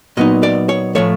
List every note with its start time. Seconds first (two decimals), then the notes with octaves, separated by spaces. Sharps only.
0.17 A#2 F#3 B3 D#4 D#5
0.43 D5
0.69 C#5
0.95 A2 F3 A3 C#5